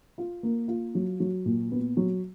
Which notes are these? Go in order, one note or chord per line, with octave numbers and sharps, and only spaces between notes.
F4
A#3
F4
F#3
F#3
A#2
B3
F#3